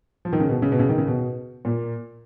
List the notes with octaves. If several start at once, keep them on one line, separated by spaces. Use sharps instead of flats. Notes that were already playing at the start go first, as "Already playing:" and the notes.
F3
D#3
C#3
B2
C#3
B2
C#3
D#3
C#3
B2
A#2